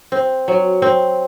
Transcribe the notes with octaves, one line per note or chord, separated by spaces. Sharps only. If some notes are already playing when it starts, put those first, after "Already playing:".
C4
F#3
C4